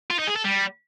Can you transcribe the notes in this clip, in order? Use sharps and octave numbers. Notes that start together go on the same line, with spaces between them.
F4
D#4
G#4
A4
G3